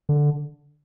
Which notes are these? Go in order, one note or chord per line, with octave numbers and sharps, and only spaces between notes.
D3